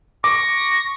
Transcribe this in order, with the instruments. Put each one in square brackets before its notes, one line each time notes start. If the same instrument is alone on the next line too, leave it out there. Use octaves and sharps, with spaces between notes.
[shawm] C#6 [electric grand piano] D6 [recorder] A#6